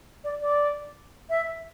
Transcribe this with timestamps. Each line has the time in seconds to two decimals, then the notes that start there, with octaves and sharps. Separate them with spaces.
0.24 D5
0.42 D5
1.30 E5